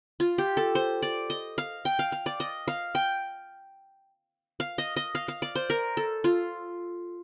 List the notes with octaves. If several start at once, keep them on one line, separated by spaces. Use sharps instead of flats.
F4
G4
A4
C5
D5
D#5
F5
G5
F5
F5
D5
D#5
F5
G5
F5
D#5
D#5
F5
F5
D5
C5
A#4
A4
F4